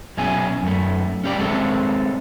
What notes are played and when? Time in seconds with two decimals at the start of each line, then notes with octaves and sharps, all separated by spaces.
0.17 B1 B2 C#4 E4 G#4 G#5
0.63 F#2 A3
1.24 C#4 G4 D5
1.39 G#3 C4 A4 C#5 E5